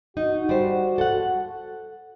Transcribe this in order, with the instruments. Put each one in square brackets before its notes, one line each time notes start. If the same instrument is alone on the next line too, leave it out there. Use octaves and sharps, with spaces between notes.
[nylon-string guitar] D#4 [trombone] F#4
[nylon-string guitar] G3 C5
A4 F#5